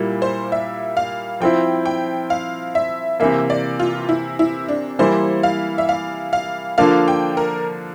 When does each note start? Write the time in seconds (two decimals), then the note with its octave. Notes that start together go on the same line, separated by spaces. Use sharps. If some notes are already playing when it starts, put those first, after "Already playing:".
Already playing: A#2 G3 A#3 E4
0.22 C5
0.52 E5
0.97 F5
1.40 F3 C4 E4 G5
1.86 G5
2.30 F5
2.75 E5
3.20 C3 E3 A#3 E5
3.50 D5
3.79 F4
4.09 E4
4.39 E4
4.69 D4
4.99 E3 G3 A#3 E4 C5
5.43 F5
5.78 E5
5.89 F5
6.33 F5
6.78 D3 F3 A#3 D4 F5
7.08 G5
7.37 A#4